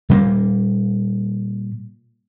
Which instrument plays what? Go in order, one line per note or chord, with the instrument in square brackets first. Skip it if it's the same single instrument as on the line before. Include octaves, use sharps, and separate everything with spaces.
[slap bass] A#2 G3 A3 A#3